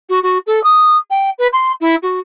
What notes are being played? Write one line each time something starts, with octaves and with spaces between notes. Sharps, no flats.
F#4
F#4
A4
D#6
G5
B4
C6
E4
F#4